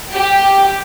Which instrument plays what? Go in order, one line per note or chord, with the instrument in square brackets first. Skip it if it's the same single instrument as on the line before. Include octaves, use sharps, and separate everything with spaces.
[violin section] G4